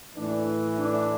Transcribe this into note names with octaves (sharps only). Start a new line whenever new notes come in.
A2 E3 D4
D4